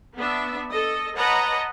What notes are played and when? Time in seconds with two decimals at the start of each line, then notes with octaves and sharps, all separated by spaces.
0.17 B3 D4 E5
0.71 A4 D#5
1.16 B4 C#5 D#5 F#5 A5 A#5